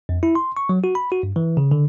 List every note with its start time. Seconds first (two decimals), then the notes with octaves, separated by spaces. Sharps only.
0.09 F2
0.23 E4
0.35 C6
0.57 C#6
0.69 F#3
0.84 F#4
0.95 B5
1.12 F#4
1.23 G2
1.36 E3
1.57 C#3
1.71 D3